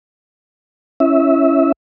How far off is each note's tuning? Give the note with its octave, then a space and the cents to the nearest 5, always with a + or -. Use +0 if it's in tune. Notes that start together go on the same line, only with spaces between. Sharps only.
C#4 +0 E4 +25 E5 -20